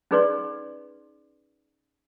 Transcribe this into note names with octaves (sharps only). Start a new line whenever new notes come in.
C#4 D#4 G#4 B4 D5 C6